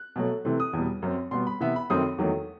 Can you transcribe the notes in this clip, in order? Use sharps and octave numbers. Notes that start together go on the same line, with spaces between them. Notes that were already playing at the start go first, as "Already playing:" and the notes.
Already playing: F#6
B2 F#3 A3
C3 E3 A3 C4
D#6
E2 B2 G3
F#2 F#3 C4
B2 G3 B3 C6
B5
C3 E3 B3 E5
B5
F#2 D#3 A3 C4 D#6
E2 D#3 F#3 A3